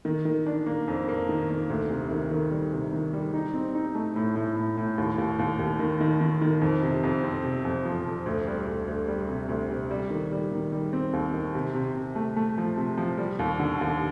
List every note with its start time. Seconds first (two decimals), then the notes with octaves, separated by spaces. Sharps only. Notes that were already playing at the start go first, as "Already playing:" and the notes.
0.05 D#3
0.25 D#3
0.46 D4
0.66 A#3
0.88 F2
1.09 A#3
1.29 D#3
1.50 A#3
1.70 D2
1.90 C3
2.11 D#3
2.31 D#3
2.51 G3
2.73 C3
2.93 D#3
3.13 G3
3.34 D#4
3.54 C4
3.75 D#4
3.95 A3
4.16 A2
4.36 A2
4.57 A2
4.77 A2
4.98 D#2
5.18 D#2
5.39 D#2
5.59 D#2
5.79 D#3
6.01 D#3
6.21 D#3
6.42 D#3
6.61 F2
6.82 C3
7.03 F2
7.24 C4
7.44 C3
7.65 F2
7.85 F3
8.06 F2
8.26 D2
8.47 G3
8.67 D2
8.87 D2
9.08 G3
9.29 C3
9.49 D2
9.70 C3
9.91 G3
10.10 D#3
10.32 G3
10.52 D#3
10.72 G3
10.93 C4
11.13 D#2
11.34 D#3
11.55 C3
11.74 C3
11.95 C3
12.16 A3
12.36 A3
12.58 F3
12.77 C3
12.98 F3
13.18 G3
13.39 D#2
13.60 D3
13.81 D#2